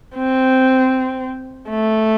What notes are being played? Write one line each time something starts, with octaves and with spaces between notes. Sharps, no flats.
C4
A3